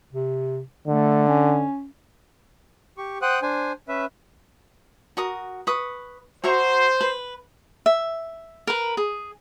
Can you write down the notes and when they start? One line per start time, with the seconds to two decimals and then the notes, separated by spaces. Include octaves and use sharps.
0.12 C3
0.87 D3 A3
1.28 C#4
2.98 G4 C#6
3.22 C5 F#5 G5 D#6 F#6
3.42 D4 C5 G#5
3.88 C#4 B4 E5
5.17 F#4 A#4 D#6
5.67 B4 C#6 D#6
6.44 F#4 C5 E5 A#5
7.01 B4
7.86 E5
8.67 A#4 B4
8.97 G#4